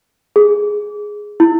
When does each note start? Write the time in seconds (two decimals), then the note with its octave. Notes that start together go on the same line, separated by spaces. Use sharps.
0.36 G#4
1.40 E4